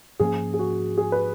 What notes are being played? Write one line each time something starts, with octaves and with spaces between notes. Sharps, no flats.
G#2 F3 A#3 C#4 G#4
G#4
F#4
G#4
B4